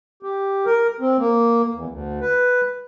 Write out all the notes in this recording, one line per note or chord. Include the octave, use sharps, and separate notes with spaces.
G4
A#4
C4
A#3
E2
D2
B4